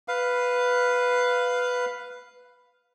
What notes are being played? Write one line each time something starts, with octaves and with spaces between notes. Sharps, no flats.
B4 F5